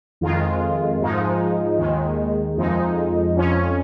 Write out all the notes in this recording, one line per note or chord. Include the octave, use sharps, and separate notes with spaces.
F2 D#3 G#3 F4
G#2 F3 G#3 D#4
D#2 D#3 G#3
F2 F3 G#3 D#4
F2 F3 C#4